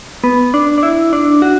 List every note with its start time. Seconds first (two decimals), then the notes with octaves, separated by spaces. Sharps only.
0.24 B3
0.54 D4
0.78 D4
0.83 E4
1.13 D4
1.42 F#4